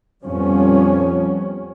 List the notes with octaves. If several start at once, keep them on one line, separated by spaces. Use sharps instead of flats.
F2 F3 G3 B3 C#4